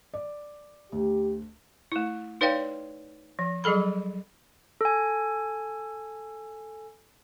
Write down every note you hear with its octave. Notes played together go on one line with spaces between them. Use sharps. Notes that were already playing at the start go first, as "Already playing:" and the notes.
D5
D2 G4
A3 E4
D#4 B4 C#5 D5 F5 G5
F3
F#3 G3 G#4 A4 B5
A4 G#5